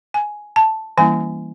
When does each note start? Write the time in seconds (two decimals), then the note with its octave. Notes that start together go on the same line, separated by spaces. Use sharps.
0.14 G#5
0.56 A5
0.97 E3 G3 A#3 C#4 E4 G#5